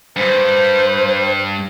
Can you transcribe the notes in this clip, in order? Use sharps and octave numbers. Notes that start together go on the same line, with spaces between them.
G2 C5